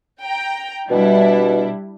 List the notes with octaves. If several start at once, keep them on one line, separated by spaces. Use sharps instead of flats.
G5 A#5
B2 G3 D4 E4